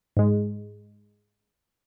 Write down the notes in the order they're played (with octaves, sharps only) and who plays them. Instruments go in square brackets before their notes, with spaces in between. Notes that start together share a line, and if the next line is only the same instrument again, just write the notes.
[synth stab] G#2 G#3